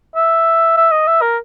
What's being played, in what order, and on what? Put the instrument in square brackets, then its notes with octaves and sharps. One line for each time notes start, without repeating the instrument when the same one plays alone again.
[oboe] E5
E5
D#5
E5
A#4